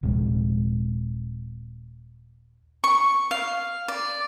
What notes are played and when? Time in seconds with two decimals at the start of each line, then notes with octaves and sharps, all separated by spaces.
0.03 D#1 A#1 C3 G#3
2.84 C#6
3.31 F5
3.88 D5